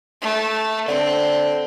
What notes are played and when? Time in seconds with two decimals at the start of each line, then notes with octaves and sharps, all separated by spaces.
0.22 A3
0.88 D3 C4